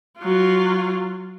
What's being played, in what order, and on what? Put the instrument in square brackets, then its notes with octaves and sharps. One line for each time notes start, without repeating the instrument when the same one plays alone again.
[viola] F#3 F4